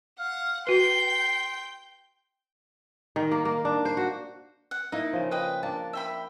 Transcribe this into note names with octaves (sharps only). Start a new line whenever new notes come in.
F5 F#5
F#4 B4 G5 C6 G6
D#3
A#3
A#3
D4
C5
F#4
F#5
A#3 D#4 E4
C#3 F3
B4 D#5 G5
A#3 D4 A5
E5 G5 B5